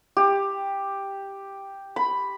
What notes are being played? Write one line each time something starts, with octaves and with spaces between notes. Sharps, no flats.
G4
B5